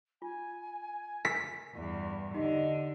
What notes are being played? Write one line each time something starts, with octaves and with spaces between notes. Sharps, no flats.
F4 G#5
A#4 B6
E2 G2
D3 D#4 G4 D#5